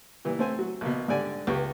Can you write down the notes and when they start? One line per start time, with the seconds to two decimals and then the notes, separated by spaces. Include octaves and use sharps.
0.25 A#2 E3 G3
0.39 A3 C4 G#5
0.59 F#3
0.81 A#1 B2
1.08 G#2 D3 G3 D5 G#5
1.47 C#2 G4 B4 C#6